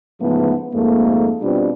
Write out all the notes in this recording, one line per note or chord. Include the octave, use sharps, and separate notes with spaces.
G#2 C#3 E3 F3 A3 B3
F2 G#2 A3 A#3
B2 G3 C4 D4 F4